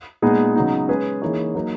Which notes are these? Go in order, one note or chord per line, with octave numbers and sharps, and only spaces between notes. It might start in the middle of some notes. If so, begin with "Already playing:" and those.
A#2 G#3 B3 D#4 G#4
C#3 F#3 B3 D#4
G#3 C#4 G#4 B4
E3 A#3 D#4 G#4 C#5
F#3 A#3 D#4 F#4